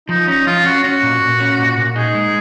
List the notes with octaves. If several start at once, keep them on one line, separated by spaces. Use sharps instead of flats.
F3 D#4
C#4 D#4
F3 F4
C#4 F#4
C#4 F#4
A#2
A#2
C#4
A#2
A#2
D#4 G#4
G#3